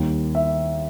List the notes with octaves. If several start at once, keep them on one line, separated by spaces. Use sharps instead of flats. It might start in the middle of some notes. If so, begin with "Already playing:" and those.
Already playing: D#2 D#3 G3
E5